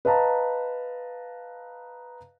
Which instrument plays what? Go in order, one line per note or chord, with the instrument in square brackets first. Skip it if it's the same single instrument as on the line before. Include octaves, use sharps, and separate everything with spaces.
[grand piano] B4 D#5 F5 A5 A#5